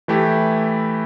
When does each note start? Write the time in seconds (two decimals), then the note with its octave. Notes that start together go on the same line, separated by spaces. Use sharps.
0.08 E3 A3 E4 G4